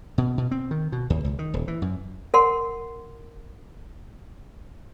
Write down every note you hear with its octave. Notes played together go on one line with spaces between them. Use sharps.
B2
B2
C4
D#3
B2
D#2
C#2
D#3
D#1
E3
F#2
A#4 F#5 C6